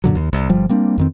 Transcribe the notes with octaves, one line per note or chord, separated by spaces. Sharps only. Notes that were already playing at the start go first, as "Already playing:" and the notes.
F#2 A#2 D3 F#3
D#2
C2
G1 F3 G3
G3 A#3 C4 D4
F2 D#3 C4